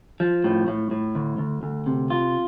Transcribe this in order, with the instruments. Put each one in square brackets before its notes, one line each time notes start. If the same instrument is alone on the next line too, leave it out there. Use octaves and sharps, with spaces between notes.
[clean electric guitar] F3
A2
A2
A2
D2
D2
D2
C3
F4